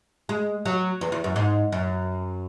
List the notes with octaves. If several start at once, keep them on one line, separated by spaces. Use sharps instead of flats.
G#3
F#3
E2
E2
F#2
G#2
F#2